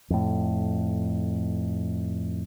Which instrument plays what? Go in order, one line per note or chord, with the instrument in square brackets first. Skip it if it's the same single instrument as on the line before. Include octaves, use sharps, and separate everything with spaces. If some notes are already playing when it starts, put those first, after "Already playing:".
[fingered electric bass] F2 A2